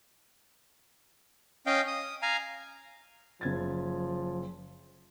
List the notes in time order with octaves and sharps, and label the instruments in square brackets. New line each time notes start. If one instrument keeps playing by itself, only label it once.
[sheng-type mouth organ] C#4 D#5 F5 G5
D#6
F5 G#5 A#5
[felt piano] F#1 G#6 A6 [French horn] F3